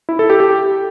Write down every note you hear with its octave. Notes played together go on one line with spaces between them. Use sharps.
E4
A4
G4
G4